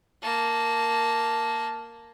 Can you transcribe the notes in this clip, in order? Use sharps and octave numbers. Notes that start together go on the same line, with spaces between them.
A#3 A5